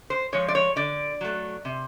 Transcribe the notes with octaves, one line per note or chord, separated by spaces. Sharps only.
C5
F3 G#3 C#5
D5
C#5
D3 D5
F#3 A3
C3